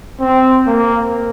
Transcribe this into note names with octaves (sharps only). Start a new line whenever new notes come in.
C4
A#3